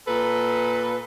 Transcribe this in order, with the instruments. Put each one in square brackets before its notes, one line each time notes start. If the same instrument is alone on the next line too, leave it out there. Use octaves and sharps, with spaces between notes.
[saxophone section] A#2 A4 B4